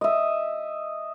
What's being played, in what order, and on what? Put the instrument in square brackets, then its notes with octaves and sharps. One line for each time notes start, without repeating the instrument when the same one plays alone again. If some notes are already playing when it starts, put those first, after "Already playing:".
[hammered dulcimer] D#5 E5